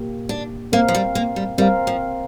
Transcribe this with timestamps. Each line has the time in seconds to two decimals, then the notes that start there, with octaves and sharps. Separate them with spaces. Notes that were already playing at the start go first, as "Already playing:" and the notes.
Already playing: A#2 A#3 G4
0.29 D4
0.72 A#3 C4 A#4 F5
0.88 F3
0.95 G3
1.15 A#3
1.36 G3
1.58 G3 C4 A#4 F5
1.87 F3